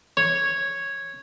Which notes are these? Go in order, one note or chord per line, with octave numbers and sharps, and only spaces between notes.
C#5